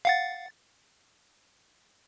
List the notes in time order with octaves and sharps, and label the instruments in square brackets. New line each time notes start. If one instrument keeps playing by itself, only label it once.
[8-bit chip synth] F5 F#5 A6